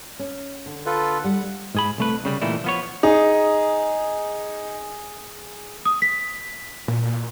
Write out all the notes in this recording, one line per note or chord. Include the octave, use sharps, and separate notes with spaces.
C#4
D3
F4 A4 B4
G3 F#5
G#2 G#4 B5
C2 A3 B4
C2 C#3 G3
A#2 E3 G3 A3 D#4 E4
F3 B3 C#5
D#4 G#4
D#6
B6
A#2